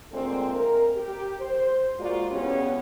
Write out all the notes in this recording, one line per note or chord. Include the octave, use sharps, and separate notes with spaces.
A#2 D3 G#3 A3 C4
A#4
G4
C5
G#3 A#3 F4 F#4 A#4 D5
E2 C#3 B3 C#4 G4